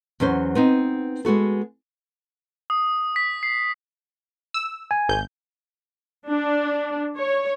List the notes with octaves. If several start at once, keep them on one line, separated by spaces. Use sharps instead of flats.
E2 F#3 C#4 C5
B3 C4 D#4
G#3 B3 F#4 A4
D#6
B6
C7
E6
G#5
G#1 G6
D4
C#5